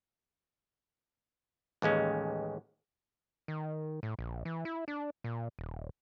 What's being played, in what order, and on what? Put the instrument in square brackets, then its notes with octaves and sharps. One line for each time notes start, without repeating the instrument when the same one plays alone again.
[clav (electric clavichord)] A1 D#2 G#3 C#4
[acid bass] D#3
A2
A#1
E3
E4
D4
A#2
D#1